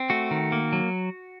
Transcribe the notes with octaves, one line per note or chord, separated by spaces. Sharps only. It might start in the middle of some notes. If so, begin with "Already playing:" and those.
Already playing: C4
A3 F#4
D#3
A#3
F#3